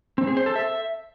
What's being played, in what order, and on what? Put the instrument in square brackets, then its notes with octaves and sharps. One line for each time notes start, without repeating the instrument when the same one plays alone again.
[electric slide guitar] C4
G#4
C5
A4
E5